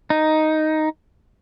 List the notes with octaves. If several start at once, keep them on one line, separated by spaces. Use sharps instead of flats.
D#4